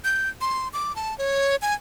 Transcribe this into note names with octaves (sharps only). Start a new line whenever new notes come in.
G6
C6
D6
A5
C#5
G#5